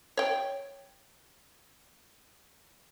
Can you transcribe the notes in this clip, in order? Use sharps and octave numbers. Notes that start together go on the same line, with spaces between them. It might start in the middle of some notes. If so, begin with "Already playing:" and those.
C#5 G5